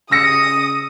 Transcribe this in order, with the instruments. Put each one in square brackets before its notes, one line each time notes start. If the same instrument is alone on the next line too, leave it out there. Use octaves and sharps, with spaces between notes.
[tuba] C#3 [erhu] D#6 [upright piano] E6 A#6 C#7